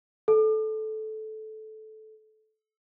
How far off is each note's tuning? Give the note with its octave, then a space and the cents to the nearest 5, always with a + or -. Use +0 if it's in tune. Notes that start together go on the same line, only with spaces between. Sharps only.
A4 -15